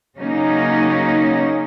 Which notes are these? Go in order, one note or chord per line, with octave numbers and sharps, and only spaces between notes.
C#3 F#3 A#3 C#4 D#4